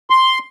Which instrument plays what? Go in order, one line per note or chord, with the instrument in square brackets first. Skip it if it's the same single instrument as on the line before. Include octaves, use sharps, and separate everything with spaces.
[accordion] C6